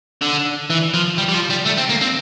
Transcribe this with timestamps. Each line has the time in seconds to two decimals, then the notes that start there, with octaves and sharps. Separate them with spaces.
0.22 D3
0.70 E3
0.94 F3
1.18 G3
1.29 G3
1.34 F3
1.50 G3
1.66 A3
1.78 C4
1.90 A#3
2.02 C4